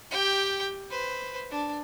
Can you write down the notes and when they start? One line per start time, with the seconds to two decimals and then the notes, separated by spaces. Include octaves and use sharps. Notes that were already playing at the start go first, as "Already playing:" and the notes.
0.10 G4 G5
0.90 B4 C5
1.51 D4